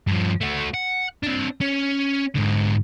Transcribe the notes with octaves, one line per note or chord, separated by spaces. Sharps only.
G2 F3
A3 F#4
F#5
C4 D4
C#4
G#2 D3